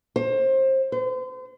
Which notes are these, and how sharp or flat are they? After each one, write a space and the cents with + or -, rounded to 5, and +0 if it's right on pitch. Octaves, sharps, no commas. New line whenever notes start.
C5 +25
C5 -40